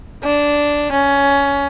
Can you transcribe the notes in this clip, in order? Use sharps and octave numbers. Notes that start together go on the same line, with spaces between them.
D4
C#4